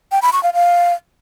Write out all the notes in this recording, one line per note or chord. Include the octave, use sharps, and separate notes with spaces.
G5
B5
C#6
F5
F5